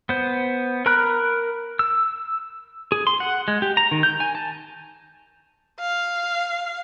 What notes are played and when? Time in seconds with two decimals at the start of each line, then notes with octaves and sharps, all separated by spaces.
0.09 B3 C5
0.86 A#4 A#5 B5 F6 F#6
1.79 E6
2.92 G#4
3.07 C6
3.20 F#5
3.48 G#3
3.62 G4
3.77 A#5
3.91 D#3
4.03 G6
4.20 G#5
4.35 A5
5.80 F5